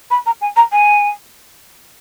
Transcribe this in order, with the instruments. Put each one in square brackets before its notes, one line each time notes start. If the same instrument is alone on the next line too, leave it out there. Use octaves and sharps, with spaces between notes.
[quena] B5
A#5
G#5
A#5
G#5